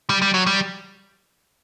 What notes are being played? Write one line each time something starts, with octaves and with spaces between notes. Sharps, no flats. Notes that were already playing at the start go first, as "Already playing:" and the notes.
G3
G3
F#3
G3